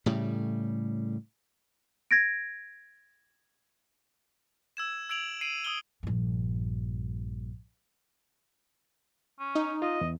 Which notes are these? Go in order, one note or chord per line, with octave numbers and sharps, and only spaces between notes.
A2 C#3 G3
G#6 A#6 D7
E6 G#6 E7
E6 G#6 D7 F7 F#7
C7 D7 D#7 F#7
D#6 E6 F#7 G7
A#1 G2
C#4
D#4
F4 D#5
E2